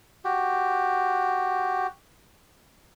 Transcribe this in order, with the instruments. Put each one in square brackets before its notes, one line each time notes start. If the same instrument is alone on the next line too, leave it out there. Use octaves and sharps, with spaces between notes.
[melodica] F#4 G4